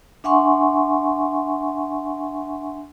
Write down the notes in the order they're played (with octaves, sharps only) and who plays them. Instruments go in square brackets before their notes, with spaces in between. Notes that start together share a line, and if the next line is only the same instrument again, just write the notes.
[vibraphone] D4 E5 F#5 G#5 C6 C#6